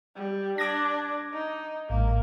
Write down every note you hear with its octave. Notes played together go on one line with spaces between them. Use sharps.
G3
D4 D6 G#6 A#6
D#4
A1 G#2 A#3